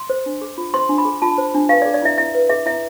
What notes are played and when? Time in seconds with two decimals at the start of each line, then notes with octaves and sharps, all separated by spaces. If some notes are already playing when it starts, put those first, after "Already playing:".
Already playing: C6
0.10 C5
0.26 D4
0.42 G#4
0.58 F4
0.74 C5 C6
0.89 D4
0.98 B5
1.05 G#4
1.22 F4 A5
1.38 C5
1.54 D4
1.69 B4 F5
1.82 D5
1.85 G#4
1.94 D5
2.02 E4 E5
2.18 E4 E5
2.35 B4
2.49 G#4 E5
2.66 E4 E5